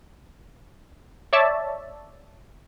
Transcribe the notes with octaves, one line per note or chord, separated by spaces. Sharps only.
C#5 D5 E5 A5